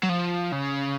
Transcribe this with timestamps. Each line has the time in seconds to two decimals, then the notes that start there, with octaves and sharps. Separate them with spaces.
0.04 F#3
0.10 F3
0.52 C#3